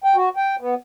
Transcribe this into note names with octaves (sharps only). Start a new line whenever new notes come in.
G5
F#4
G5
B3